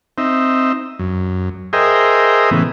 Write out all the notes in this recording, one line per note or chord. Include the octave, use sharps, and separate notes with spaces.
C4 D#4 E5
F#2
G#4 A#4 C5 D#5 E5 G5
A2 C#3 E3 B3